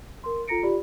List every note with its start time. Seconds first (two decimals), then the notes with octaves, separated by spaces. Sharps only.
0.24 A#4 C6
0.48 F4 A4 A#5 A#6 C#7 D7
0.63 F4 G4 D5 B5